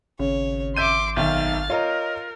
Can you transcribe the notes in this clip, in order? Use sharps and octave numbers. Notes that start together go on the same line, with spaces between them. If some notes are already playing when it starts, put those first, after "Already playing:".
G#1 C#3 C#5
E5 C6 D6 G6 D#7
B1 D#3 E5 F5 F6 G6 A6
F4 A#4 C#5 D#5 A#5